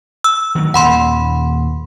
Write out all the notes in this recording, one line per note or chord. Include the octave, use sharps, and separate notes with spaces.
E6
D#3 F#3 A3
D#2 A#2 F#5 B5 C6